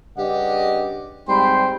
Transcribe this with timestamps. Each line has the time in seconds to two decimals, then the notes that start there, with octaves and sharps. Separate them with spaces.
0.18 G2 C#3 G4 D5 D#5 F#5
1.28 G#2 G3 C4 G5 B5 C6